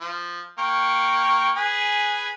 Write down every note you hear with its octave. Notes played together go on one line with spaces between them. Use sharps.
F3
A#3 G5 C#6
G#4 B4 G#5